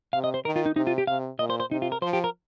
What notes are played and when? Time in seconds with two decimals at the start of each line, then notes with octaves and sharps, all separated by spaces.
0.13 C3 F5
0.24 D#5
0.34 C5
0.45 D#3 A#4
0.56 F4
0.66 D#4
0.76 C3 D#4
0.87 F4
0.98 G4
1.07 C3 F5
1.39 A#2 D#5
1.50 C5
1.60 C5
1.70 C3 D#4
1.82 F4
1.92 A#4
2.02 F3 C5
2.13 G4
2.24 A#4